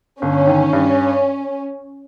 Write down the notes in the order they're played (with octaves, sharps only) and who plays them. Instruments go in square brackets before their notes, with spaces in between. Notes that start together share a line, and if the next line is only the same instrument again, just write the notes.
[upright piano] G1 [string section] C#4
[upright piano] D#3
G2